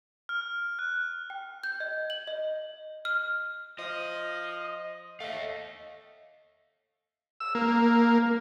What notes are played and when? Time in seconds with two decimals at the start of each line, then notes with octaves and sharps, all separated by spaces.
0.29 F6
0.79 F#6
1.30 G5
1.64 G6
1.80 D#5
2.10 F#7
2.27 D#5
3.05 F6
3.79 F3 D#5
5.20 A3 D#5 F5
7.40 E6
7.55 A#3